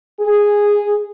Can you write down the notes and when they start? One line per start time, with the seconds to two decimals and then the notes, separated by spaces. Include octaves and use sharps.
0.20 G#4